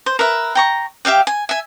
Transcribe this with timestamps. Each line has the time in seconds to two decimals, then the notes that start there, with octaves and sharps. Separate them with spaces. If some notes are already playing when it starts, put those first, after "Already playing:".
0.06 C5
0.19 A#4 B4 E5
0.55 G5 A#5 C#6
1.05 G4 E5 F5 G5
1.27 G#5
1.49 E5 G#5